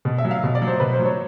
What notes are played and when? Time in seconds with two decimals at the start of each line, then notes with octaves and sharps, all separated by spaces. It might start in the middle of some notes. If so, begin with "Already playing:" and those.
0.05 B2
0.18 E5
0.25 F#3
0.31 F5
0.43 B2
0.55 D5
0.62 F#3
0.67 C5
0.80 B2 B4
0.93 C5
0.99 F#3
1.06 C#5